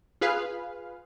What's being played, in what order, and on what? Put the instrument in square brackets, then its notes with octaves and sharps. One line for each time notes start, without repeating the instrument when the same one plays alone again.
[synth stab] F4 G#4 B4 F5